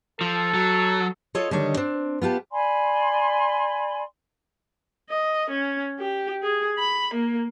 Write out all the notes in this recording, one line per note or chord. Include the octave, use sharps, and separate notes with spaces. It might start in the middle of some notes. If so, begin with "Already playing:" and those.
F3 A4
F#3
F4 A4 C#5 D#5
D3 D#3 G3 D4 C#5 D#5
C4 D4
B3 F4 G4 A5
D5 G#5 B5 C6
D#5
C#4
G4
G#4
B5
A#3